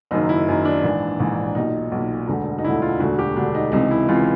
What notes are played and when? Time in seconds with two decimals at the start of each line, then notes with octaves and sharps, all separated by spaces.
0.11 F#1 F#2 D#3 D#4
0.29 E4
0.48 F#1 F#2 D#3
0.65 D4
0.84 A#1 G#2 E3
1.19 A#1 G#2 E3
1.55 B1 A#2 D#4
1.92 B1 A#2
2.28 E1 D2 D3
2.58 D#4
2.64 E1 D2 D3 E4
2.82 F4
2.99 E1 D2 D3 F#4
3.19 G4
3.36 E1 D2 D3 D4
3.55 D#4
3.72 C#2 C3 E3 D#4
3.91 E4
4.09 C#2 C3 E3 F4